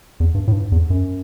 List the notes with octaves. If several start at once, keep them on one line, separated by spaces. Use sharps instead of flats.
E2
G2
A2
G2
E2
F#2